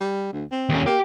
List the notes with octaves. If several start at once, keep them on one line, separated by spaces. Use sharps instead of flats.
G3
D2
C4
D#2 C#4
A#3 G4